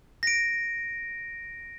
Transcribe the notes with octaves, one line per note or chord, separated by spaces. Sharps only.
A#6 D7